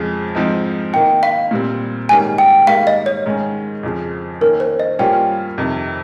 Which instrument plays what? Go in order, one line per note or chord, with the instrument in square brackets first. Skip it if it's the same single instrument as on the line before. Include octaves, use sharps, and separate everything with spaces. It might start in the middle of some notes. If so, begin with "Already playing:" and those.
Already playing: [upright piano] F2 C#3 F3 G#3
G#2 F3 C4 D#4
[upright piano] D#3 A#3 D#4 [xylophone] G5
[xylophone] F5
[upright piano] A#2 G3 C4
[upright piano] G#2 D#3 G3 A#3 C#4 [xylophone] G#5
[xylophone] G5
[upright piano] G#2 D#3 G3 A#3 [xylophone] F5
[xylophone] D#5
C#5
[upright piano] G#2 D#3 G#3 C#4
F2 C#3 F3
[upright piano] D#3 A#3 C#4 [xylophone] A#4
[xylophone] C5
D#5
[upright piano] G2 G3 A#3 C#4 F4 [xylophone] G5
[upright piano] F2 C3 D#3